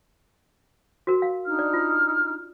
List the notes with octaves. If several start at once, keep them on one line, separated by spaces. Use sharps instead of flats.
F#4 A#4
F5
D4 D#4 F6
D5
F4